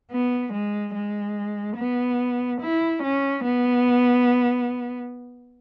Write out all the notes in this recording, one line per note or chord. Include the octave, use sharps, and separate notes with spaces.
B3
G#3
G#3
B3
E4
C#4
B3